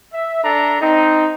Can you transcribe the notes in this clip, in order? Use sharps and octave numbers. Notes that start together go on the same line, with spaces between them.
E5
D4 A4 A#5
C4 D#4